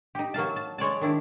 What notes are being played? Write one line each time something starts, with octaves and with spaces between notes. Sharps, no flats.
D#4 G4
F#3 A#3 F5 A5
A5
G#3 C#5 D5 A5
D#3 D4 E4